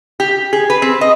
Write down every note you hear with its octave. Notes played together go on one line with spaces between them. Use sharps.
G4
G#4
B4
C4
D#5